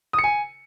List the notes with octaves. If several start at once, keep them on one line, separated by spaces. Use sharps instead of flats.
D#6
C#7
G#5